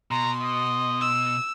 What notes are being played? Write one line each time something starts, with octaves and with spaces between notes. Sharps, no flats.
B2 A#5 C6
D#5
E6